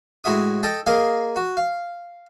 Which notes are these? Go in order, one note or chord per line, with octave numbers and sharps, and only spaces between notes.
A2 G#3 F#4 E5 D#6
A4 D#5 G5 A5
A#3 G#4 A#4 D#5 F5
F#4
F5